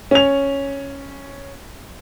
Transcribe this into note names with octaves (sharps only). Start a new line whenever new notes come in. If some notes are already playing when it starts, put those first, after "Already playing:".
C#4 F7